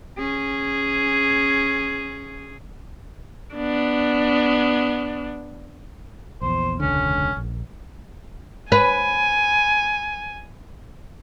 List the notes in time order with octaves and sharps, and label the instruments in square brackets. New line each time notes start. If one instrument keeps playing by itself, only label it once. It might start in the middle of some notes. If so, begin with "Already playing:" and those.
[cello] C#4 G#4
[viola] B3 D4
[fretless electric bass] A#1 E2 [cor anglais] C5
[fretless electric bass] E1 C#2 D3 [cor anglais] C#4
[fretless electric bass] A#1
[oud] B4 [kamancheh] G#5